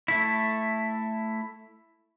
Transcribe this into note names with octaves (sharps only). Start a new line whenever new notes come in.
A3 E4